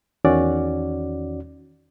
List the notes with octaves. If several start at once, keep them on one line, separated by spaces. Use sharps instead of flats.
E2 D#3 C#4 F#4 D5